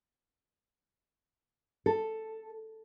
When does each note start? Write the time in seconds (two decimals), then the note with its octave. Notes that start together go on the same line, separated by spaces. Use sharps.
1.86 A4